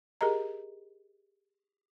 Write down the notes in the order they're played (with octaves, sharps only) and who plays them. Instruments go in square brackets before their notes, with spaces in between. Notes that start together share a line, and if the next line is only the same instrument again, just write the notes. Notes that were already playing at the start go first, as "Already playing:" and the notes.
[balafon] G4 G#4 A#4 D#5 A#5